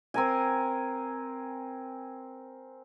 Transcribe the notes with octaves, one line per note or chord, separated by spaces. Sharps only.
C4 A#4 G#5